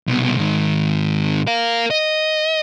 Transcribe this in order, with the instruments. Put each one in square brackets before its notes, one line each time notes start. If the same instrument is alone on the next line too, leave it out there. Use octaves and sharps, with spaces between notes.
[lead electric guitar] C2 B2
G#2 D#3
A#4 F5
D#5